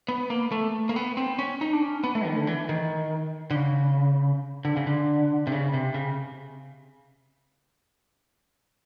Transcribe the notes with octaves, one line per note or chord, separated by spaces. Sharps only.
B3
A#3
A3
A#3
B3
C4
C#4
D#4
D4
C#4
B3
A3
D#3
D3
E3
D#3
D3
C#3
D3
C#3
D3
C3
C#3
C3
C#3